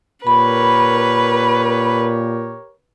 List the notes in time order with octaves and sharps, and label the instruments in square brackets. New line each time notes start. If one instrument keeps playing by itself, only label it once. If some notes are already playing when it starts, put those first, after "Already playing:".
[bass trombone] A#2 [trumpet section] G4 A#4 C#5 [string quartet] B4 [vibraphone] B5